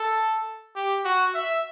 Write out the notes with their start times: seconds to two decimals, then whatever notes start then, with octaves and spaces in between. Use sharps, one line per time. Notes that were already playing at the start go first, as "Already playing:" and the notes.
Already playing: A4
0.76 G4
1.05 F#4
1.35 E5